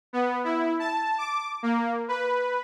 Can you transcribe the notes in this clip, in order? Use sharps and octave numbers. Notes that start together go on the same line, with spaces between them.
B3
E4
A5
D6
A#3
B4